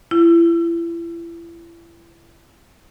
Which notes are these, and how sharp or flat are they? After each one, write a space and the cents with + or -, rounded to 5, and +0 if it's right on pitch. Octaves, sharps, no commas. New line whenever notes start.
E4 +35